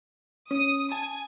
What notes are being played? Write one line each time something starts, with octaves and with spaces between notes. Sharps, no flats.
C#4 D#6
G#5 A5